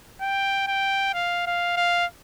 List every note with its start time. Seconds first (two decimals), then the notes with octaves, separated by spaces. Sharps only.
0.21 G5
0.67 G5
1.14 F5
1.47 F5
1.77 F5